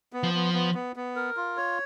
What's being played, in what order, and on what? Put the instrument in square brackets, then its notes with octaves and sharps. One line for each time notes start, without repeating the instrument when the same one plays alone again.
[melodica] B3
[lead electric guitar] F3
[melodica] B3
B3
B3
B3
A#4
F4
C#5